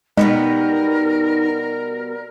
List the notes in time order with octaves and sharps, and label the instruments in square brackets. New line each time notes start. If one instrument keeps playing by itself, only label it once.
[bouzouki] B2 G3 B3 [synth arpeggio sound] G#3 D#5 [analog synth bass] D#4 [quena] A#4